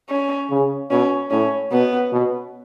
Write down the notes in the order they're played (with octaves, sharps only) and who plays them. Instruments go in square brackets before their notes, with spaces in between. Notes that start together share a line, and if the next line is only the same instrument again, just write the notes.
[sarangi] C#4
[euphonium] C#3
[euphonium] B2 [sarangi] C#4
[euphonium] A2 [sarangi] C#4
[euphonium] B2 [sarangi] B3
[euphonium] B2